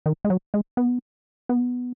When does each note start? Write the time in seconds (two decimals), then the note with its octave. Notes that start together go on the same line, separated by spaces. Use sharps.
0.06 D#3
0.25 G#3
0.30 F#3
0.54 G#3
0.77 B3
1.49 B3